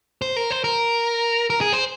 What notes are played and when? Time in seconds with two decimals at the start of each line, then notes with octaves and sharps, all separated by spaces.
0.22 C5
0.36 A#4
0.51 C5
0.64 A#4
1.50 A#4
1.61 G#4
1.73 C5